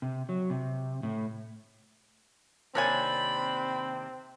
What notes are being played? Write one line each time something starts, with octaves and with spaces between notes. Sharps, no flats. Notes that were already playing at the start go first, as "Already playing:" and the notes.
C3
F#3
C3
A2
D#2 C3 C4 D4 A#4 C#5 G#5 B5